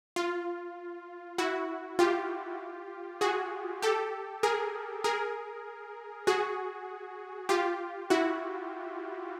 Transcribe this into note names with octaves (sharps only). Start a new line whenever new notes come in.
F4
E4 F#4
F4 G4
F#4 G#4
G4 A4
G#4 A#4
G#4 A#4
F#4 G#4
F4 G4
E4 F#4